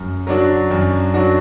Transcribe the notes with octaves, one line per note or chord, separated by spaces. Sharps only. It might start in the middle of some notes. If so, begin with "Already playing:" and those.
Already playing: F#2
F#3 D4 F#4
F#2
F#3 D4 F#4